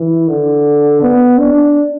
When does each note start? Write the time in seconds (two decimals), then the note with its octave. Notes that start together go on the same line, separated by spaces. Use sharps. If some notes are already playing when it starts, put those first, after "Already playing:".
Already playing: E3
0.28 D3
1.02 B3
1.38 D4